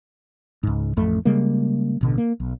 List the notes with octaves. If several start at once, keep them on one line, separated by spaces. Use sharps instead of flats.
C#2 G#2
A1 F2 A3
C#3 G3 G#3 A#3
A1 B2 D3
A#3
B1